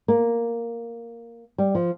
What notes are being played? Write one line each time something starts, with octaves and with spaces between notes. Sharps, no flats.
A#3
G3
F3